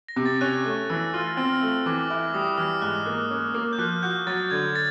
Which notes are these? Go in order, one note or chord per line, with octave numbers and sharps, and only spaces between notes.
A#6
C3
A6
C#4 F#6
A3
E3 E6
F4 F6
C4 F6
E6
A3
E3 D6
E4 D6
G3 D#6
E3 F6
G#2 F#6
A#3
C#4
A#3
G6
F3 F#6
F#4 G6
F#3 A6
D3 G#6
A6